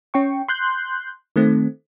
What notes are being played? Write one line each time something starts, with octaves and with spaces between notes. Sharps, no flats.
C#4 G5 C#6
C6 F#6 G6
D#3 A3 C4